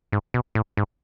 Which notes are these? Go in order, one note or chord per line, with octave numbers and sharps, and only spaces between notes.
G#2
B2
A2
G#2